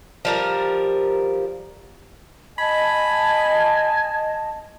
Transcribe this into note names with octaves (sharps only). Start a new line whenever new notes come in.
F3 G3 A#4
D#5 G#5 A5 B5